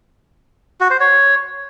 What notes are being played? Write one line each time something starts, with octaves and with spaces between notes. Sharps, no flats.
F#4
C5
C#5